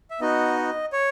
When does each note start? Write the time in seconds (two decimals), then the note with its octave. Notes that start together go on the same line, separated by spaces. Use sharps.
0.10 E5
0.20 B3 D#4 F#4 D#5
0.93 C#5